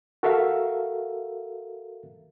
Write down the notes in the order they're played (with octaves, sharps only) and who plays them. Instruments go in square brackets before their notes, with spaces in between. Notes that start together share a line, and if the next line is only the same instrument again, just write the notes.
[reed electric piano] F#4 A4 A#4 E5 F5